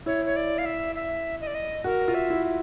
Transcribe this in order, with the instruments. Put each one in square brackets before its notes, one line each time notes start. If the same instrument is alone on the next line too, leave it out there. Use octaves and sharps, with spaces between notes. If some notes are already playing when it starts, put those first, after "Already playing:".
[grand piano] E4 [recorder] C#5
[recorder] C#5
D5
F5
E5
E5
D#5
D5
D#5
[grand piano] F#4 [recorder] A#4
[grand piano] F4
[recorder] E5
[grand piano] E4